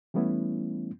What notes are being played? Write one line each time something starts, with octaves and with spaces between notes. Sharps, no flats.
E3 G3 A3 B3 C#4 E4